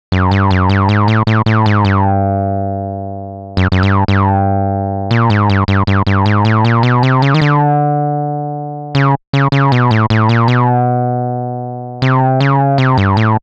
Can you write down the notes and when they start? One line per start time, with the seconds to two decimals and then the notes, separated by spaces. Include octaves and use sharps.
0.12 F#2
0.31 G2
0.51 F#2
0.69 G2
0.89 G#2
1.08 A2
1.27 A2
1.46 A2
1.66 G#2
1.85 G2
3.57 F#2
3.72 F#2
3.83 G2
4.08 G2
5.11 A#2
5.30 G#2
5.50 G2
5.68 G2
5.87 G2
6.07 G2
6.26 G#2
6.45 A2
6.65 A#2
6.83 B2
7.03 C3
7.22 C#3
7.34 D#3
7.41 D3
8.95 C#3
9.33 C#3
9.52 C#3
9.72 B2
9.91 A2
10.10 A2
10.29 A#2
10.48 B2
12.02 C3
12.41 C#3
12.78 C3
12.98 G2
13.17 A2